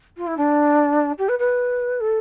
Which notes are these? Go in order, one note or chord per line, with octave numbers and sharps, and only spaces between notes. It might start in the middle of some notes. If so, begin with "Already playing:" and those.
F4
E4
D4
G4
B4
B4
A4